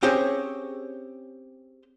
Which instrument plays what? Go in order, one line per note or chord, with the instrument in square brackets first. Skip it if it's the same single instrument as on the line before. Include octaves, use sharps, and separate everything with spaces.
[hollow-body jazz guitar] C4 C#4 G4 G#4 C5 C#5